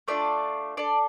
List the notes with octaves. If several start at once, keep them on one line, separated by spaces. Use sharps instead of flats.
A3 D4 F4 D5
D4 A4 D5